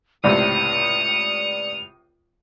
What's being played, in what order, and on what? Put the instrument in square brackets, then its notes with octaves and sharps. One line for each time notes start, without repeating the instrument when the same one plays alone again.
[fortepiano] C#2 A2 C3 [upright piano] D5 [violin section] D#6 C#7 [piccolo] F7